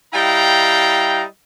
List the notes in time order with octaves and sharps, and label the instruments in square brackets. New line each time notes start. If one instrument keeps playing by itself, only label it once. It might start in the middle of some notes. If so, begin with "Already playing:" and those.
[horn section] G3 E4 D#5 F5 G5 A#5